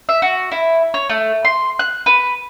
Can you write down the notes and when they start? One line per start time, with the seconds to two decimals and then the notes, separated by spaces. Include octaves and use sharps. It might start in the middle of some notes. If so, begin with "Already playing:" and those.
0.09 E5
0.22 F#4
0.52 E4
0.94 C#5
1.10 A3
1.45 C6
1.79 F#6
2.06 B4